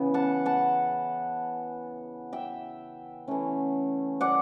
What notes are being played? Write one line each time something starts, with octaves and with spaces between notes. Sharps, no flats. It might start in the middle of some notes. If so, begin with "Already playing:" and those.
Already playing: C#3 E3 B3
F#5 A5
F#5 A5
E5 G5
E3 A3 C#4
D5 F#5